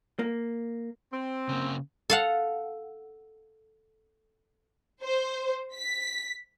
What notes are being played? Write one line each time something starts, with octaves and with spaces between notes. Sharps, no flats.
A#3
C4
C#3 A#3
A4 F5 F#5
C5
B6